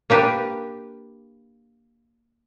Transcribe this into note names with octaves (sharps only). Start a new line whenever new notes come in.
A#3 D4 G4 B4